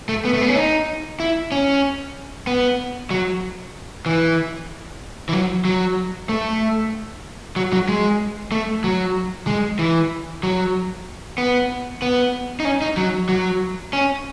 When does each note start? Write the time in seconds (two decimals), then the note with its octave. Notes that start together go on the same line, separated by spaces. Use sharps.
0.09 A3
0.25 B3
0.34 A3
0.41 B3
0.49 C#4
0.56 D#4
1.20 E4
1.52 C#4
2.47 B3
3.11 F#3
4.06 E3
5.29 E3
5.33 F#3
5.65 F#3
6.29 A3
7.56 F#3
7.73 F#3
7.89 G#3
8.52 A3
8.84 F#3
9.47 G#3
9.79 E3
10.43 F#3
11.38 B3
12.02 B3
12.60 D#4
12.65 C#4
12.82 D#4
12.97 F#3
13.29 F#3
13.93 C#4